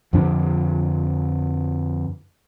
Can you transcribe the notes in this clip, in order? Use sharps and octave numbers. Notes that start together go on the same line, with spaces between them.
F2 D3 F3 D4